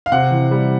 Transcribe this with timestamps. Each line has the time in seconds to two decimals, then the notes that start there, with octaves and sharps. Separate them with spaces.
0.06 F5
0.12 C3 F#5
0.31 E3
0.51 G3